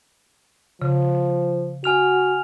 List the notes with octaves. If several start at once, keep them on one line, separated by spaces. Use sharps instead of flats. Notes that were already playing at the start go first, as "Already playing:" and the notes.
C#3 F3
F#4 G#5 F6 F7